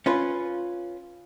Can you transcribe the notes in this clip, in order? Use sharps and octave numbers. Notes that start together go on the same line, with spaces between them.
C#4 F4 B4